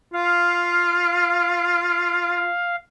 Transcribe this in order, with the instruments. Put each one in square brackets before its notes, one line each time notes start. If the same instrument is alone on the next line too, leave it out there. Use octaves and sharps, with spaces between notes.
[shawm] F4 [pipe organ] F5